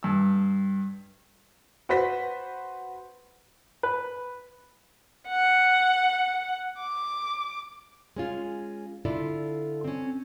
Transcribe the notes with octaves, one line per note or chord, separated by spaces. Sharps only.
G2 E6
F#4 B4 C5 B6
B4
F#5
D6
G#3 C#4 F4
D3 E4 F4 A4 D5
C4 C#4